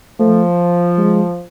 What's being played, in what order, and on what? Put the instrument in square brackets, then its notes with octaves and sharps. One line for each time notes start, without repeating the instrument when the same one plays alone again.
[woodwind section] F3 [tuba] A3
[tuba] G#3